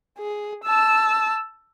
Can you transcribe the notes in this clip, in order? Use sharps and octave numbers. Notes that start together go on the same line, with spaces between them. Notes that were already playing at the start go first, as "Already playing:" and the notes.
G#4
A5 E6